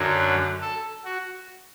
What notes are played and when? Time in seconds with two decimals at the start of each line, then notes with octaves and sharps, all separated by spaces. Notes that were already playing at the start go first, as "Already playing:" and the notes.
Already playing: F#2 D3 F#3
0.61 A4
1.05 F#4